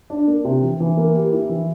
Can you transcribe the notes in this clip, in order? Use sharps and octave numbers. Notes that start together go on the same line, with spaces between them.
D4
A#3
C3
E3
E3
A#3
G4
E4
E3